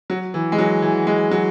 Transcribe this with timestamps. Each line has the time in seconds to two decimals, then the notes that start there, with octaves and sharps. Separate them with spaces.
0.10 F#3
0.34 E3
0.52 G#3
0.58 F#3
0.82 E3
1.07 G#3
1.31 F#3